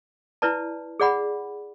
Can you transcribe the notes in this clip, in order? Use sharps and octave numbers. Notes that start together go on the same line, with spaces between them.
E4 B4 D5 A5
G#4 D5 F#5 B5